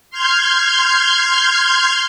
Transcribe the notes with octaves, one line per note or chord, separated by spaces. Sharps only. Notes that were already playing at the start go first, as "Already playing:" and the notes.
C6 F6 G6 G#6